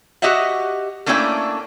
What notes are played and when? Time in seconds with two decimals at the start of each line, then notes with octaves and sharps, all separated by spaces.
0.22 F#4 G4 D#5 E5 F#5
1.06 A3 A#3 C#4 D4 E4 G5